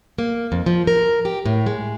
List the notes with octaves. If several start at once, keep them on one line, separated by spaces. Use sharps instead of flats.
A#3
F2
F3
A#4
G4
A2
G#3